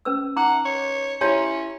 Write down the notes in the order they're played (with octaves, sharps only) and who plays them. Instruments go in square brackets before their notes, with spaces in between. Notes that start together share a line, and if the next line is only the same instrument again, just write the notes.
[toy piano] C#4 B4 E6
[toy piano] D#4 A#5 D6 [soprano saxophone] F#5
[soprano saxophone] C#5
[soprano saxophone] C#4 [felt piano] E4 A#5 C6 [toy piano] G4 C#5 A5